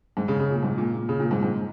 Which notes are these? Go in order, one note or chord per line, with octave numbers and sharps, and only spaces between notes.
G#2
C#3
C#3
A#2
G#2
A#2
C#3
A#2
G#2
G#2